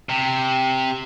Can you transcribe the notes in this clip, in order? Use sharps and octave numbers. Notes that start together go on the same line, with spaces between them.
C3